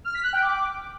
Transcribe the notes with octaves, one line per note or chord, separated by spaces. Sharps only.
F6
B6
F#6
G5
D6